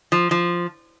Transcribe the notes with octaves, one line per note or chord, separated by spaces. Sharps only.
F3
F3